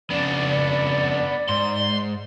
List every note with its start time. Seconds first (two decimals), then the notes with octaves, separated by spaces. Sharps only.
0.10 F2 C#3 B3 D4 D5
1.49 G#2 C6